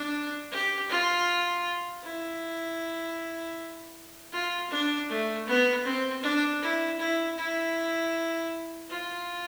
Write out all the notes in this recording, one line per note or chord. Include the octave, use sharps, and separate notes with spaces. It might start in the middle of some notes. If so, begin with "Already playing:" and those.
Already playing: D4
G4
F4
E4
F4
D4
A3
B3
C4
D4
E4
E4
E4
F4